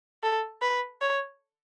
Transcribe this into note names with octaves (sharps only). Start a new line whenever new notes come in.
A4
B4
C#5